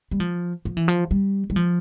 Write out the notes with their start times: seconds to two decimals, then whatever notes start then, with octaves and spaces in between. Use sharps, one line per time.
0.11 G3
0.20 F3
0.65 F3
0.77 E3
0.88 F3
1.11 G3
1.50 G3
1.56 F3